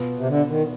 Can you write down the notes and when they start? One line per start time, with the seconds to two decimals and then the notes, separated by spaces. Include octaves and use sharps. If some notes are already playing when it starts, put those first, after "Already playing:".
Already playing: B2 B3 F4
0.18 C3
0.28 D3
0.48 D#3